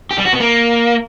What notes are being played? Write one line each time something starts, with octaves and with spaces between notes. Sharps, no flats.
G4
G3
F#4
B3
A#3